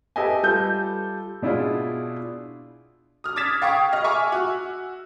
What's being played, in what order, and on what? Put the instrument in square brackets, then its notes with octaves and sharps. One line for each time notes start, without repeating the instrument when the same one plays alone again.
[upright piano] G4 A4 B4 D#5 E5 G#5
G3 F4 A4 G6
B2 D4 E4 F4 G#4
[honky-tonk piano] D#6 F6
D6 D#6 G#6 A6 B6 E7
F5 G5 C#6 D#6
D#5 F6
E5 G#5 C#6 D6 E6
F#4